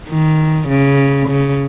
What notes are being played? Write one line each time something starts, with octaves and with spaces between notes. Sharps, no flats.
D#3
C#3
C#3